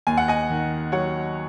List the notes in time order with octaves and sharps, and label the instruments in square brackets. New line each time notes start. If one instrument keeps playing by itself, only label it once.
[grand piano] D#2 [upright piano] G#5
[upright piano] F#5
D#5 G#5
[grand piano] D#3
[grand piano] F#3 [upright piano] C#5 F#5